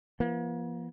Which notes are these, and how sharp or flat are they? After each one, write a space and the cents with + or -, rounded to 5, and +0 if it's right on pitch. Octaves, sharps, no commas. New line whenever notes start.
F3 -40 A#3 +45